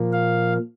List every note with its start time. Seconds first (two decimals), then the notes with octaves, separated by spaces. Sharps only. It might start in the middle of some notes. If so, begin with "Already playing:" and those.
Already playing: A#2 F3 A#3
0.13 F5